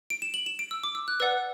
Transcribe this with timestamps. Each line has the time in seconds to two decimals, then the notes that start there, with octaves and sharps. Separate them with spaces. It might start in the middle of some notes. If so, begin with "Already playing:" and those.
0.10 D7
0.22 E7
0.34 F#7
0.46 E7
0.59 D7
0.71 E6
0.84 D6
0.95 E6
1.08 F#6
1.20 B4 D5 F#5 E6